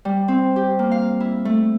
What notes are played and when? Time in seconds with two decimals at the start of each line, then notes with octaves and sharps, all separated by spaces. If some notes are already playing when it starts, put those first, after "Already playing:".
0.05 G3
0.28 C4
0.56 G4
0.79 A#3
0.92 F5
1.20 E4
1.45 A3